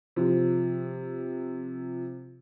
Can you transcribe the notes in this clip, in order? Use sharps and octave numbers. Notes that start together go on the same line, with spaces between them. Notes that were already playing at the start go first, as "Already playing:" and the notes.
C3 F3